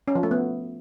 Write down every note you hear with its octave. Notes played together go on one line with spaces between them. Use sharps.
C#4
F3
A3
B3